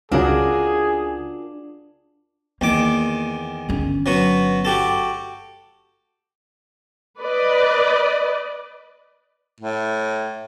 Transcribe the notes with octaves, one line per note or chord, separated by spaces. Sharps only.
C#2 C#3 D4 F4 F#4 G#4 A#4
E2 D#3 A#3 D6
G1 C#4
F#3 B3 F#4
F#4 G4 A4
B4 D5 D#5
A2